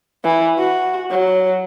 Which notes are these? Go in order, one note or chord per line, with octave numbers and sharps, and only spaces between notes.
E3
F#4
F#3